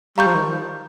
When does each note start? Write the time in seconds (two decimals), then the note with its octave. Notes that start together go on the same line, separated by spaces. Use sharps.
0.18 G3 F5 A#5 C#6 G6
0.26 F3
0.34 D#3